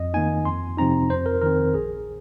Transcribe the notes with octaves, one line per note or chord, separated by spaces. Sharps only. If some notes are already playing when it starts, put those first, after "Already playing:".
Already playing: F2 D#5
D#3 A#3 D#4 G#5
F2 C6
C3 F3 C4 D#4 A#5
F2 C5
A#4
D#3 C4 A#4
A#1 G#4